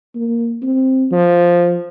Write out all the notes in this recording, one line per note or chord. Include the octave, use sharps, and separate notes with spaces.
A#3
C4
F3